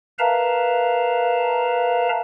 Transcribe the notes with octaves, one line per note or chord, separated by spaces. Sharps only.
A#4 B4 E5 F5 A5 A#5